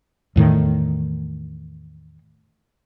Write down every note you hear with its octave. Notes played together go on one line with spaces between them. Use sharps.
E2 A2 D#3